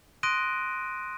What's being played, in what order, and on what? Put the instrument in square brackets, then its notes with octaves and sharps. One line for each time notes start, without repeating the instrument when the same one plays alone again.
[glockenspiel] C6 D#6 F#6 A#6 D7 D#7